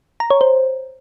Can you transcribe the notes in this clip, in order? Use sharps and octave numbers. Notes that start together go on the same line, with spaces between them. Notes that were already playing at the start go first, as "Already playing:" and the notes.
A#5
C#5
C5